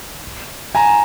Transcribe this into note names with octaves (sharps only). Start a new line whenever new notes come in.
G#5 A#5